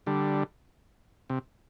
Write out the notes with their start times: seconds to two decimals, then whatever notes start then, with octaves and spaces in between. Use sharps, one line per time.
0.07 D3 G3
1.30 C3